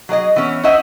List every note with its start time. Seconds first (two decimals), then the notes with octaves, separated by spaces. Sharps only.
0.09 F#3 G#4 D5 D#5
0.36 E3 B3 C#4 C#5
0.63 C#4 E4 C5 D#5 E5 F#5